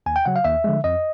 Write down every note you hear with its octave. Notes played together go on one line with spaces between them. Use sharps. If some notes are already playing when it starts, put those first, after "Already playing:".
D#2 G#5
G5
C#3 F#3 F#5
F5
D#2 E5
D3 F3 G#3
F2 D#5